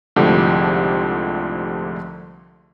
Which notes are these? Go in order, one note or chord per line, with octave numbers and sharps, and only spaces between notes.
C2 G#2 D3 F3 A3 G4